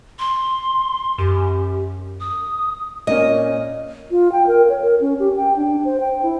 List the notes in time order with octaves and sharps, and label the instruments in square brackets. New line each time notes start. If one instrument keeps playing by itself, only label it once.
[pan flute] C6
[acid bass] F#2 [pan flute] G4
[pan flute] D#6
[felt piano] A#2 A#3 C#4 [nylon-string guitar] D#5
[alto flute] F4
G5
A#4
C#5
A#4
C#4
G4
G5
D4
C5
G5
E4